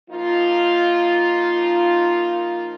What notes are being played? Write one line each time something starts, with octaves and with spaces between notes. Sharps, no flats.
F3 A#3 D#4 F4